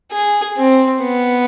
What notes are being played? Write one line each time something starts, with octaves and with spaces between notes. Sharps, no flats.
G#4
C4
B3